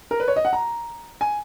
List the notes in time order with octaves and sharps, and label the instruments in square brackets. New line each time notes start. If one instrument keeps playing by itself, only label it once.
[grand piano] A#4
B4
C#5
D#5
F#5
A#5
G#5